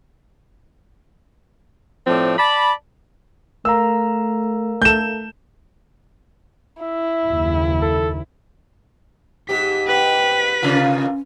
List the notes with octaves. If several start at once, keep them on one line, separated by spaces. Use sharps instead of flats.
A2 F3 A3 C4 D5
D5 A5 B5
A3 A#4 F5 A#5 E6
A3 A4 G6 E7
E4 E5
F#1 D#2
A4
G#2 G4 B6
B4 G5 B6
C3 A#3 C#4 F4